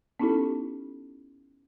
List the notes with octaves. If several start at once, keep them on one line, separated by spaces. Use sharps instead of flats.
B3 C#4 D#4 E4 G4 A4